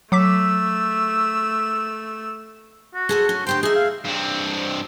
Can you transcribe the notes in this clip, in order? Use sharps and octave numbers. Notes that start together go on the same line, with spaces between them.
F#3 A3 D6 E6 B6
F#4
G#4 A4 C5
C#4
D2 G4 C5 G5
D#4 G#4 E5
F5
G2 C4